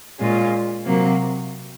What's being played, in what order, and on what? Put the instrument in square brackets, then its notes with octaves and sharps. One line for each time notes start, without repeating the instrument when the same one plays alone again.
[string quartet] A#2 G#3 C#4 F4
C3 F#3 A#3